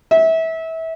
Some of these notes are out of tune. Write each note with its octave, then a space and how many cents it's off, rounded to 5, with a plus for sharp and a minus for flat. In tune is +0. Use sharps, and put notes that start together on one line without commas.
E5 -25